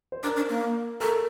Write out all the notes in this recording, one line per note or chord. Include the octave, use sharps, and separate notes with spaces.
C5
D4 A#4
D4
A#3
A4 A#4